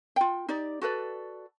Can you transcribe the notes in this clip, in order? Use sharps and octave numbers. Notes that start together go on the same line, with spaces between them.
F4 G5
D#4 G4 D5
F#4 A4 B4 D5